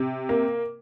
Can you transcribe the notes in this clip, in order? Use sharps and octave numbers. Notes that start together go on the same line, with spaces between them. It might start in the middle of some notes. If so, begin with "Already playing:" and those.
Already playing: C3
A#3